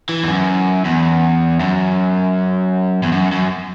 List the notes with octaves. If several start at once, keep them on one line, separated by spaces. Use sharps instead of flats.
E3
E2
F#2
E2
F#2
E2
F#2
F#2